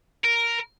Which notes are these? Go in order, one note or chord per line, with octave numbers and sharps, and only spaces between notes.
A#4